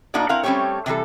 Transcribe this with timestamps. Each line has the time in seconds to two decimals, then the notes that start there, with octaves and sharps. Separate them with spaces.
0.14 A2 A#3 D4 D#4 F#4 D5
0.29 C4 E4 A#4 F5 F#5
0.43 G3 A3 C4 C#4 G4 C#5
0.86 C3 E3 F3 G3 A4